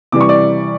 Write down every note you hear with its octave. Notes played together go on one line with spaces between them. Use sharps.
C3 E3 G3 D6
C#6
D5 D6